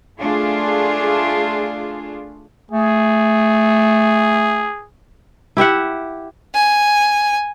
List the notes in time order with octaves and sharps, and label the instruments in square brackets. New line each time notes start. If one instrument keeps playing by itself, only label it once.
[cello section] A3 D4 F4 G#4
[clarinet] A3 [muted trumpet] G#4
[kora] E4 G4 E5 F#5
[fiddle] G#5